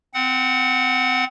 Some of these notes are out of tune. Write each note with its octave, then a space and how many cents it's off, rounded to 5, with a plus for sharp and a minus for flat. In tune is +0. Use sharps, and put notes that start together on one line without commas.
C4 -20 F#5 +0